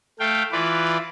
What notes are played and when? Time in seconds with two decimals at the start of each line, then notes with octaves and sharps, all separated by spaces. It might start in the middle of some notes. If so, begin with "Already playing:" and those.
0.20 A3 F5 G5
0.52 E3 F4 B4 D5